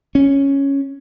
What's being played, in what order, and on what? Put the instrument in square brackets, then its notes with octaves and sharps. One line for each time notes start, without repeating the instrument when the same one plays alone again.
[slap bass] C#4